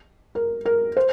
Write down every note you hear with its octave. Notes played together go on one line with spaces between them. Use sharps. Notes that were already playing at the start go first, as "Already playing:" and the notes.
A#4
A#4
C5